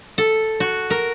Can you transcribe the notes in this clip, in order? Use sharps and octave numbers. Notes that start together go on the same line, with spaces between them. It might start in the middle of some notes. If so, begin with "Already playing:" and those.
A4
F#4
A#4